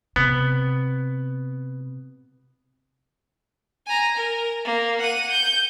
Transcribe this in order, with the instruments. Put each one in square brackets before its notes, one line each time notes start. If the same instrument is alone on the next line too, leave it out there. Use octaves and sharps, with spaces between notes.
[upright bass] C3 [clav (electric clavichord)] B3
[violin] G#5 A#5
A#4
A#3
F#5 D#7
G6